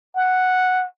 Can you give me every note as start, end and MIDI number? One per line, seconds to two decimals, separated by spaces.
0.16 0.85 78